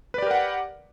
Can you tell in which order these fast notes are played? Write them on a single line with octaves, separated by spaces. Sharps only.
B4 D5 G4 A#4 F#5